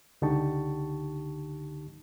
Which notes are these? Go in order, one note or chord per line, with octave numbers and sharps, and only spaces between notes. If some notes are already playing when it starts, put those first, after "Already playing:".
C#2 D3 D#4 G4 A5 C#6